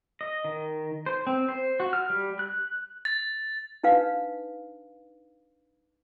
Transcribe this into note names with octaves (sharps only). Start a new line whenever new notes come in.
D#5
D#3
C5
C4
C5
F#4
F6
G3
F#6
A6
D4 D#4 B4 F5